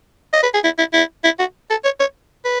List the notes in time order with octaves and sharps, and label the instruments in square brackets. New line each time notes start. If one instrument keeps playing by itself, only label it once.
[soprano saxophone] D#5
B4
G#4
E4
E4
E4
E4
F#4
A4
C#5
C#5
B4